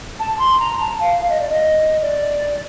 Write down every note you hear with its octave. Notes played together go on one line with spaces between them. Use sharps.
A5
C6
A#5
A5
F5
F5
D#5
D5
D#5
D5